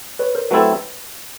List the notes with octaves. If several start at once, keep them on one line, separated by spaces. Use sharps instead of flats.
B4 C#5
A#4 C5
F#3 A3 C4 E4 A4 B4 C#5